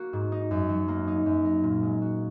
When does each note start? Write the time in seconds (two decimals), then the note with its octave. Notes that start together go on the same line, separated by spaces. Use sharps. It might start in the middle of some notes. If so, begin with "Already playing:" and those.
Already playing: A#3 F#4
0.13 G#2
0.32 D#4
0.51 F#2
0.69 F#3
0.88 A#3
1.07 D#4
1.26 F#2
1.45 A#4
1.63 A#2
1.83 G#3
2.02 F#4